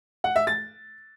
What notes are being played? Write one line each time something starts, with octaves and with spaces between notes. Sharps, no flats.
F#5
E5
A6